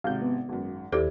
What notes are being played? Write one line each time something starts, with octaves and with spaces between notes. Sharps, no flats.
G#1 C3 F5 G6
B3
G#1 F#2
D#2 E4 G4 A4 C5 D5